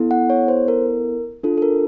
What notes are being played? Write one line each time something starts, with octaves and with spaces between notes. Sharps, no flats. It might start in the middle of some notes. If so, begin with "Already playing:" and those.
Already playing: B3 E4 A4
F#5
C#5
C5
A#4
D4 F4 A4
A4
A#4